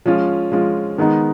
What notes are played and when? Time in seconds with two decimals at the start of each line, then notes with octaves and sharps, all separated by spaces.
0.06 F3 G#3 C#4 F4
0.52 F3 G#3 C#4 F4
0.98 D#3 G#3 B3 D#4